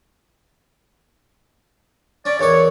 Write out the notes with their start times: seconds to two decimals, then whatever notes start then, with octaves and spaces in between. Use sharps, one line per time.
2.25 C#4 D5
2.39 E2 D#3 C#5 D5 C#6